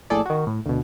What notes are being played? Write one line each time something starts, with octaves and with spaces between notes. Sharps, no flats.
A#1 A2 G#4 A4 D5
D#3 F#4
A2
D2 B2